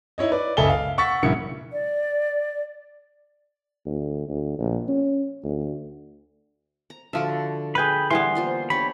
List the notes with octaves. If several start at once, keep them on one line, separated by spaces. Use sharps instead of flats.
D#4 E4 C#5 D#5
B4 D5
F#1 C#2 A4 E5 G#5 G7
F5
F#5 C#6 E6 A6 B6
A#1 G2 C#3 A#3 E4 C#7
D5
D2
D2
A#1
C#4
D2
A#5
D3 F3 F#4 E5 D6
G#4 B4 G5 B5
E3 G3 B3 G4 C6
A#3 F4 C5
D4 G4 C#5 B5